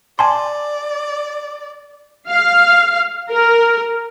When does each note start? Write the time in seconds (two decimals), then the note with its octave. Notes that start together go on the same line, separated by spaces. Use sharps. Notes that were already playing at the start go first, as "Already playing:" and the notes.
0.19 D5 G#5 A5 C6
2.28 F5
3.30 A#4